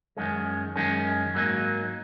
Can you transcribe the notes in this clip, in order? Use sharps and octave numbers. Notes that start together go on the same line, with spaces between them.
F#2 D#3 G#3 C#4
F#2 D#3 G#3 C#4
G#2 F#3 A#3 D#4